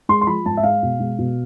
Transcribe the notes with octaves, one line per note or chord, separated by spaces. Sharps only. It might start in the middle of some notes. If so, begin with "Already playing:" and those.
G#3 C6
C6
F3 B5
G#2 A5
E5
G#3 F5
B2
G#3
B2